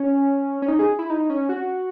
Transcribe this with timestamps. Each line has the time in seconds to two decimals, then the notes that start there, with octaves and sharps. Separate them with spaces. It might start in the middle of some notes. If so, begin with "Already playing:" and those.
Already playing: C#4
0.62 C#4
0.68 D#4
0.79 G#4
0.99 E4
1.10 D#4
1.30 C#4
1.49 F#4